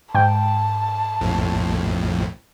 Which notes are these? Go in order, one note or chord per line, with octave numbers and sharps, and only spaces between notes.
G#2 G5 A5
A#1 F2 A2